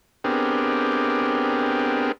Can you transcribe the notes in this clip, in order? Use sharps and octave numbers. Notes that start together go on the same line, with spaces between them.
B3 C4 D4 G4 G#4 A#4